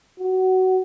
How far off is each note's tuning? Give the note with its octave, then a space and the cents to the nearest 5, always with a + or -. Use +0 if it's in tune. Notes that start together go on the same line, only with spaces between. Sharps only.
F#4 +20